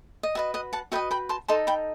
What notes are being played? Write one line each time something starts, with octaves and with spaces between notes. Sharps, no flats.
D#5
F#4 B4 D#5 E5
D#5 F#5
F#5 A5
F#4 B4 D#5 E5 G5
G5 B5
A5 C6
D#4 A4 D#5 A5 C6
G5 B5